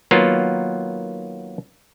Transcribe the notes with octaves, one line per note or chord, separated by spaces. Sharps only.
D#3 F#3 A#3 B3 F4